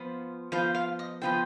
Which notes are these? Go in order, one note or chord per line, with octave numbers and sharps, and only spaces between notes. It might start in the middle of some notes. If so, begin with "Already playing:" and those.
Already playing: F3 B3 F4 C5
F3 B3 F4 C5 F5
F5
D#5
F3 B3 F4 C5 G5